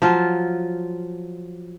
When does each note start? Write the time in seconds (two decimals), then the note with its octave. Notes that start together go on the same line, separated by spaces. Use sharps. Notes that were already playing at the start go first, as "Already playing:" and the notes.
0.02 F3 F#3 F4